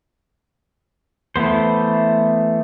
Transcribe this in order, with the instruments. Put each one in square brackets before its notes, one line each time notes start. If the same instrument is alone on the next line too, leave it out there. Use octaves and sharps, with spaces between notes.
[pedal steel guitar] E3 A3 B3 C5